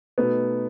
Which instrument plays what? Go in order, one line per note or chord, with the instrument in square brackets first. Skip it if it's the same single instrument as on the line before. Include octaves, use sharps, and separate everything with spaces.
[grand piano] B2 A3 D#4 [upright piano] B3